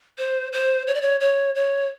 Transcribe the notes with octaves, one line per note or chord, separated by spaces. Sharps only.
C5
C5
C#5
D5
C#5
C#5
C#5